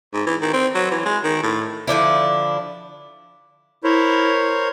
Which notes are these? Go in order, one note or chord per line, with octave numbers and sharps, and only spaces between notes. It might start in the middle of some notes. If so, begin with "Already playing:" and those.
G#2
E3
D#3
C4
F#3
E3
G#3
D#3
A2
D3 F3 D4 E4
E4 A#4 C5 C#5